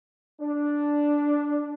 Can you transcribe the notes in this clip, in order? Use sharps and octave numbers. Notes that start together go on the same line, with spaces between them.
D4